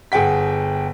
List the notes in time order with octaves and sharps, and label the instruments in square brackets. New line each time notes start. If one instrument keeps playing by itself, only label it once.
[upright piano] G1 G#4 F#5 G5 B6